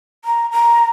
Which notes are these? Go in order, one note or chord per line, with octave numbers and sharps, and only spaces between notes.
A#5
A#5